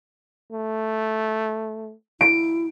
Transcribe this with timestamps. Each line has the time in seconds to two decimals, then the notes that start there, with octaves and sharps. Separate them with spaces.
0.52 A3
2.21 E4 D7